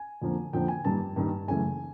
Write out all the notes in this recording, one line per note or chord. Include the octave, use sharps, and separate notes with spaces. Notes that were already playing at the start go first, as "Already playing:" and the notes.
Already playing: G#5
F2 D3 F3 A#3
F2 D3 F3 A#3 G5
G#5
G2 D#3 G3 A#3 A5
G2 D#3 G3 A#3
F#2 C#3 E3 A3 G#5